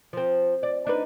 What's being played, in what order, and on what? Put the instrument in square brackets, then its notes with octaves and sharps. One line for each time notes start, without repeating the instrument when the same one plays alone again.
[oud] F3 C4
D5
D4 D#4 B4